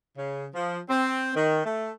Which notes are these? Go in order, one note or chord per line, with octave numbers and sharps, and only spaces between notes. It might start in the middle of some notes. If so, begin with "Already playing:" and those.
C#3
F3
C4
D#3
A3